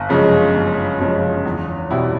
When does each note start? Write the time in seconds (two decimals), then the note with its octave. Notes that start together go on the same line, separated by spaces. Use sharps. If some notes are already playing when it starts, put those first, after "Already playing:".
Already playing: G1
0.09 F#2 C#3 F3 G#3
0.55 G1
0.99 F#2 C#3 F3 G#3
1.45 E2
1.90 B2 G3 C4 E4